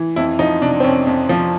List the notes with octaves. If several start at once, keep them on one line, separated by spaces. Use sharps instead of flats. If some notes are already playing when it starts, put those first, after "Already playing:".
Already playing: E3
F2 E4
F3 D#4
C3 D4
C4
F2 C#4
F2
F3